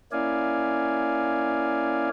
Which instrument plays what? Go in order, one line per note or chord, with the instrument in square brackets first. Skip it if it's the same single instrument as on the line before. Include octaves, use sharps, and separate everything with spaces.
[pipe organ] A#3 C#4 E4 D5 F5 G#5